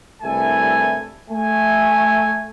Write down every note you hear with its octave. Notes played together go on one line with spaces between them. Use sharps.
C2 G2 A3 E4 A4 G#5
A3 G#5